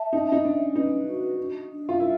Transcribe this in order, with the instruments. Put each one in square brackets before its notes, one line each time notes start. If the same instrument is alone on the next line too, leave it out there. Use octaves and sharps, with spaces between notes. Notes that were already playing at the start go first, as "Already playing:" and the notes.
Already playing: [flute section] E5 A5
[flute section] C#4 [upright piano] D#4
[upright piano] D#4
[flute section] C#4 [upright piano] D4
[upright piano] D#4 [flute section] B4
[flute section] F#4
D4
D4
[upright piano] F4
[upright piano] E4 [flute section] A#4